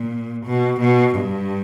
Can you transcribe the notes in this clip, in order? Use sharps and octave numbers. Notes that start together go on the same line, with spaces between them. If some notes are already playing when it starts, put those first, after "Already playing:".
Already playing: A#2
B2
B2
G2